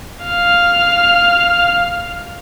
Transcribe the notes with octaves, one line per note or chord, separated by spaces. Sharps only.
F5 F6